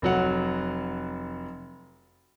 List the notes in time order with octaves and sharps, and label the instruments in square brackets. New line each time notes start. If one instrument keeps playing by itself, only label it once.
[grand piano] F1 F#3 F#5